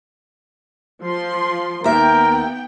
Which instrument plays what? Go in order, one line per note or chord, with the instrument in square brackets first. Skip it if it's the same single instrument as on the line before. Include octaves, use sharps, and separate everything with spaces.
[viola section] F3 C6
[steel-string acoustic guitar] D#2 E5 [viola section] B3 G5 [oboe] A#4